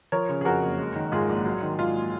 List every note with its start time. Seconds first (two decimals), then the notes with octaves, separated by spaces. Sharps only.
0.12 F3 A#4 C#5
0.29 C#3
0.41 G#4
0.45 F2 F#4 A#4
0.63 F#1
0.78 G#3
0.95 D#3
1.12 G#2 F4 G#4
1.29 A#1
1.45 F#3
1.62 D#3
1.78 G#2 F4